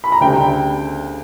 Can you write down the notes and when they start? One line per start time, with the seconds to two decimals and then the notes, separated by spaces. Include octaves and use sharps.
0.04 B5
0.12 A#5
0.21 D2 C#3 G3 G5